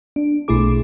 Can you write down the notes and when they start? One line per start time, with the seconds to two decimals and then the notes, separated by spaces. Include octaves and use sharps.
0.16 D4
0.48 B1 B2 A3 E4 G#4 D6